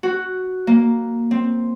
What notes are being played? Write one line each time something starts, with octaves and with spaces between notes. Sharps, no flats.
F#4
A#3
C4